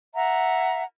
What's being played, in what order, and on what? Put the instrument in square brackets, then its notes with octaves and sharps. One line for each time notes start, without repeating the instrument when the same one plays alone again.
[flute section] E5 F#5 A#5